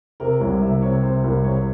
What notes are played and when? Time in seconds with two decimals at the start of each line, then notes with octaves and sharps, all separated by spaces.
0.20 C3 A#4
0.40 C2 C#5
0.61 C3 E5
0.82 C3 C#5
1.03 C3 C5
1.24 C2 A#4
1.44 C3 C#5